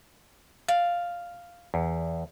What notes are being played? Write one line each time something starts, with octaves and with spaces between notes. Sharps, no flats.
D5 F5
E2